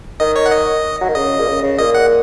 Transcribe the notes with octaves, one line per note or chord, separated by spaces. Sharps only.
D#3 D#5
C#5
F#5
D#5
F#3
D#3
C#3 D#5
A#2
C#3
C#3
A#2 D#5
F#5